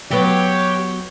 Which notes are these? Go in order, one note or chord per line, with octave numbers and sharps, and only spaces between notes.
F#3 B3 G4 C#5